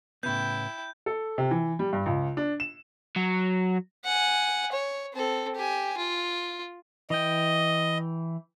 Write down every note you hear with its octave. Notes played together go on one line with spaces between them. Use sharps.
A2 C#3 B3 E4 G5 G6
A4
C3
E3
G3
G2
C#2
D4
E7
F#3
F#5 G#5
C#5
C4 A4
G4 G#5
F4
E3 D#5 G5